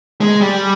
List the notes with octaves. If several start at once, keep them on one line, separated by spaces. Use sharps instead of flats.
G#3
G3